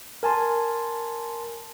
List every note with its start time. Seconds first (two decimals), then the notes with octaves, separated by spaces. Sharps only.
0.23 A#4 G#5 A5 C6